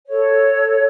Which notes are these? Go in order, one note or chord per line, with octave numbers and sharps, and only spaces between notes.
A4 C#5